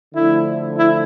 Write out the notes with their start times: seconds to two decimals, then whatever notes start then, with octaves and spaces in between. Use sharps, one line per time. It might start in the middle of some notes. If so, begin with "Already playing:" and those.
0.14 D3 F3 A3 E4
0.75 E4